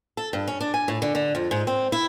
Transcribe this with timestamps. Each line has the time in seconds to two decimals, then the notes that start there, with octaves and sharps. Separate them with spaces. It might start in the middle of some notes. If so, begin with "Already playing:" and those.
0.17 A4
0.33 G2
0.47 C#4
0.61 D4
0.74 G#5
0.88 A2
1.02 D3
1.15 D3
1.35 F2
1.51 G#2
1.67 C4
1.92 E4